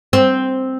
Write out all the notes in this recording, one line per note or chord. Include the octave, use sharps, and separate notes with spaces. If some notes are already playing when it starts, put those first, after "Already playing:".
C4